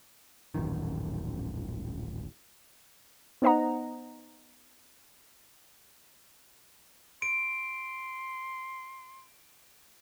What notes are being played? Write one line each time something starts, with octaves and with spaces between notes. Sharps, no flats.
D#1 A1 F#2 D#3
B3 D#4 C5 D#5 F#5 A#5
C6 D7